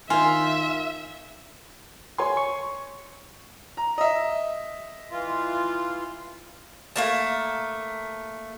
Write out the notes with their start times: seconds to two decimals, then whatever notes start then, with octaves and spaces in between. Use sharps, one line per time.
0.10 D#3 F4 C5 E5 G#5
2.18 C#5 G#5 C6
2.37 C#6
3.77 A#5
3.98 D#5 E5
5.11 E3 F4
6.96 A3 A#3 A5